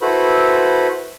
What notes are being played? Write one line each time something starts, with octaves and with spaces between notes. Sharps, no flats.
E4 F#4 A4 B4 C5 B5